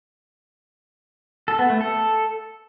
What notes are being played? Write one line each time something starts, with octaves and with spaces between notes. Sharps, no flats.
A4
B3
A3
A4